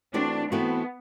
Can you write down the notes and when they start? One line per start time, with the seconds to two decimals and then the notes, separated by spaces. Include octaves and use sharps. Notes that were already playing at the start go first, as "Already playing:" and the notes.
0.14 E3 A3 C4 D4 F#4
0.51 E3 A3 B3 C4 F#4